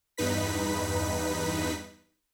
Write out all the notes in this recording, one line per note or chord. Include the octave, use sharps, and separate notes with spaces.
E2 G2 D#4 B4 B6